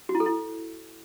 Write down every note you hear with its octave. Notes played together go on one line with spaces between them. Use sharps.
F#4
E4
A4
E4